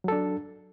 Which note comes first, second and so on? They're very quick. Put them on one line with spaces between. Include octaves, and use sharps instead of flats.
F#3 A4 D4